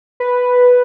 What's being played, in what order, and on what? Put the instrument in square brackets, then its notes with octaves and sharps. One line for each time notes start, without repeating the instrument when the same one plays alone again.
[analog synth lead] B4